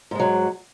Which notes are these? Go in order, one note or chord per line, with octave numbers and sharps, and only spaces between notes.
G#2 F#3 G#3